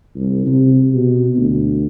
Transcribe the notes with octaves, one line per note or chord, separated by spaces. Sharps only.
C2
C3
B2
D2